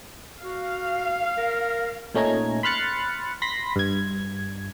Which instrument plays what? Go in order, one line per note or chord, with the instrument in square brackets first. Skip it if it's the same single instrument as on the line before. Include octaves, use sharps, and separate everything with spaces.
[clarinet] F#4 [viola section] F5
[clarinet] A#4
[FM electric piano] A#2 A3 C#4 D#4 A#5 G#6
B5 C6 F6 F#6 A6 C#7
B5 C6 A#6 B6
G2 G#6